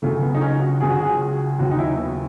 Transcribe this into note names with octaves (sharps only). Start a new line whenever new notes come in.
C#2 C#3 F#3 A3
B3
D#4
C#4
F#4
C#2 C#3 F#3 G#4
F#4
G#4
D#2 C#3 F#3 F#4
D#4
E4
B3